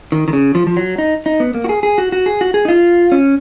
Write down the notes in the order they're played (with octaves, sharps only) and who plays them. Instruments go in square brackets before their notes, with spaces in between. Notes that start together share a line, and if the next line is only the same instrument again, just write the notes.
[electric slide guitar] D#3
D#3
C#3
F3
F3
F#3
D#4
D#4
B3
A#3
F#4
G#4
G#4
F#4
F#4
G#4
F#4
G#4
D#4
F4
C#4